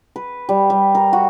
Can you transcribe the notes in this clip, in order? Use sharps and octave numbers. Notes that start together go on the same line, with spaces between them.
B4
G3
G3
A#4
F#4